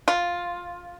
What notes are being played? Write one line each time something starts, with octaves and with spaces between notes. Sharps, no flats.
F4